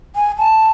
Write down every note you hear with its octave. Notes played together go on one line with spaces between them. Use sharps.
G#5
A5